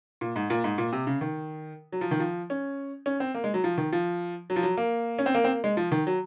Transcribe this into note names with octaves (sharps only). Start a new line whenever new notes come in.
A#2
G#2
A#2
G#2
A#2
C3
C#3
D#3
F#3
F3
D#3
F3
C#4
C#4
C4
A#3
G#3
F#3
F3
D#3
F3
F#3
F3
F#3
A#3
C#4
C4
A#3
C4
A#3
G#3
F3
D#3
F#3